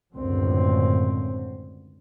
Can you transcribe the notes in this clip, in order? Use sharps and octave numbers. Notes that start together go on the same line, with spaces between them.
C#2 F#2 A2 D3 C4